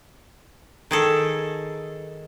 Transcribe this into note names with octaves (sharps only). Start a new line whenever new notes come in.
D#3 G#4 A4